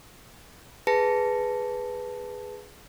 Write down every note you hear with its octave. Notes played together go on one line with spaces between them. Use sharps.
G#4 B4 A5 A#6 C#7